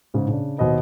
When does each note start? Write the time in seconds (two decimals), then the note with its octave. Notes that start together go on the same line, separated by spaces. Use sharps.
0.14 G#2 C#3 G#4
0.28 C#3 D4
0.58 D#2 B2 C5 D#5 B5